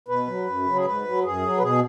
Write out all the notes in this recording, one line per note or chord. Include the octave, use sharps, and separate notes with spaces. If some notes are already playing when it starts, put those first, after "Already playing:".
B2 B4
F#3
F#2
C#3 F#3
G#4
G#2 B4
F#3
F#2 G#4
F#3
B4
B2 G#4